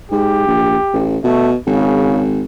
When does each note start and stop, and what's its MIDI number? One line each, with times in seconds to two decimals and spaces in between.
0.11 0.42 44
0.11 1.10 67
0.47 0.77 34
0.93 1.18 33
1.24 1.55 47
1.24 1.50 57
1.67 2.43 32
1.67 2.23 49